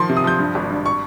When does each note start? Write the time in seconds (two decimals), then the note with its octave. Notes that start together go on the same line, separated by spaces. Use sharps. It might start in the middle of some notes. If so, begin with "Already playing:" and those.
Already playing: D#3 F3 C6
0.09 C3
0.17 D#6
0.24 F3 G6
0.39 G2
0.55 G#1
0.70 G2
0.86 C#6